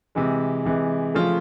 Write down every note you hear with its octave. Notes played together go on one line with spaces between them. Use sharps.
C3 E3 G#3
C3 E3 G#3
C#3 F3 A3 C#4 F4